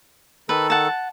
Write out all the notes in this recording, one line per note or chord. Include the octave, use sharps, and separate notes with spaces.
D#3 A4 B4
F#5 A5